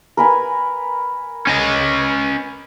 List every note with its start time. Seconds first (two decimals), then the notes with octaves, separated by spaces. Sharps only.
0.17 A#4 B4 G#5
1.47 C#4 D#5